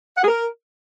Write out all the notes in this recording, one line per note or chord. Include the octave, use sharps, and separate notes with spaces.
F#5
G#4
A#4